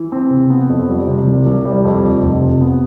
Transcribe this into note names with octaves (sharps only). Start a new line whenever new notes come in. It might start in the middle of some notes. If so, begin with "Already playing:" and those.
Already playing: E3
C4
C3
B3
F2
G3
C3
C2
C2
G3
F2
F1
F1
C3
B3